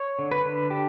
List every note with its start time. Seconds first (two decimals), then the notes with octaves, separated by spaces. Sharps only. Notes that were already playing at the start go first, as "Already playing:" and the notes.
Already playing: C#5
0.19 D3
0.31 B4
0.45 D3
0.70 D4 G4